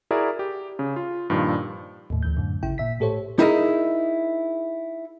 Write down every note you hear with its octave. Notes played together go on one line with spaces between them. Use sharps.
E4 F#4 G#4 A#4 D5 E5
G4
C#3
F4
G2 A#2 D#3 F3
D#2 A2
D2 E3 G6
F#2 A2 D3
A1 C#3 E4 G5
A#2 E5 B6
A2 G4 A4 C5 C#5
D#4 E4 G#4 A#4 C#5 D#5